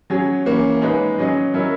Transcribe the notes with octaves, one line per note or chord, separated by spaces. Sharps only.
F#3 C#4 G#4 C#5
E3 A#3 C#4
G#3 D#4 G#4 B4
F#3 C#4 G#4 D#5
F#3 C#4 E4 A#4 C#5